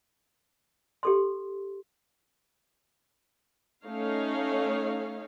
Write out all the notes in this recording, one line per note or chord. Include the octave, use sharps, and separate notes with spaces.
G4 A4 C6
A3 C#4 D#4 C#5 F5